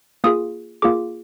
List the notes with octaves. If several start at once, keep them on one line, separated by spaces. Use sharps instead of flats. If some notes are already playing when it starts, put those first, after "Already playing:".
A#3 F4 G#4 D#6
A#3 F4 G#4 D6